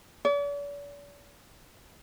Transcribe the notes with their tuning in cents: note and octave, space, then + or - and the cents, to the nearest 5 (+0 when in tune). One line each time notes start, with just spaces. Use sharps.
D5 -45